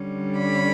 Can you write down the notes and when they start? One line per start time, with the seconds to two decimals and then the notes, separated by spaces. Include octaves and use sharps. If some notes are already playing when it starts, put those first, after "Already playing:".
Already playing: D3 G3 C#4
0.38 B5